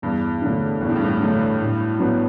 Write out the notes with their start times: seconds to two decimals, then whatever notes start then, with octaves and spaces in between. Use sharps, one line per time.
0.02 E2 G2
0.42 D3 F#3 A3
0.81 E2 B2
0.89 A2
0.96 G2
1.03 A2
1.20 D3 F#3 A3
1.60 A2
1.99 F#3 B3 D4 F#4